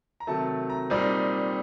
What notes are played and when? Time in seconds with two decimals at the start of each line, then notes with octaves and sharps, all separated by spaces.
0.20 A#5
0.27 C3 D#3 F#3 A3 A5
0.70 A#5
0.90 A#2 G3 C4 D#4